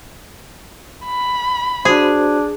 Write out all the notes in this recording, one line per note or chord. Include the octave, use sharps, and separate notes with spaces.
B5
D4 F#4 G#4 C5